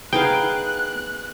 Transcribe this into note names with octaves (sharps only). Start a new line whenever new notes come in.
B3 D#4 G#4 A#4 F5 G5 F#6